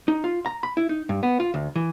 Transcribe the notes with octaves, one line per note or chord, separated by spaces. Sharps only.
D#4
F4
A#5
B5
E4
D#4
G2
B3
F4
D2
E3